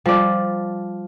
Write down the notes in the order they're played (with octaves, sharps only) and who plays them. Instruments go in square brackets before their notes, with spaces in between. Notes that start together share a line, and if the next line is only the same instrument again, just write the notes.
[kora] F3 D5 [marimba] G3